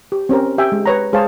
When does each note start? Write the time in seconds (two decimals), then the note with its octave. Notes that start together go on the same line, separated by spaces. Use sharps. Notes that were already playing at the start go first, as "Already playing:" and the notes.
0.12 G4
0.29 C4 C#4 G4 A#4
0.58 G4 E5 G5 G#5
0.72 G#3
0.86 B4 C#5 A#5
1.13 G#3 G#4 C5 C#5 F5 A5